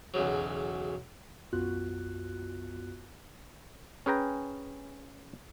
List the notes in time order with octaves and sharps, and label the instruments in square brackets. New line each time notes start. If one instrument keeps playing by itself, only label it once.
[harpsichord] B1 E2 C#3 F#3
[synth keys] B1 F#2 B3 F4 F#4 F#6
[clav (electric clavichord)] C#4 G#4 B4 G5 A#5